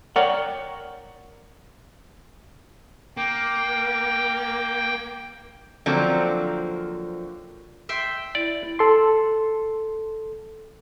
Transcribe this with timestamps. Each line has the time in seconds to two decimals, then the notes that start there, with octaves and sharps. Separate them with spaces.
0.16 A#4 C#5 D5 F#5 G5
3.17 A#3 G5
5.86 D3 F3 F#3 A#3 C4
7.89 E5 G5 C6
8.35 E4 D5
8.79 A4 C6